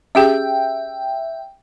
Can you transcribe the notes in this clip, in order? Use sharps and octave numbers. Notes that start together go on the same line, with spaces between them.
C#4 G4 G#4 E5 G5